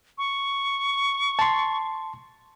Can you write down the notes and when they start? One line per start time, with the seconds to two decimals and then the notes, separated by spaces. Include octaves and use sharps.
0.18 C#6
1.39 A5 C6